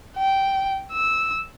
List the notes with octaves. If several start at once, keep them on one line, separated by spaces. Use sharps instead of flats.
G5
E6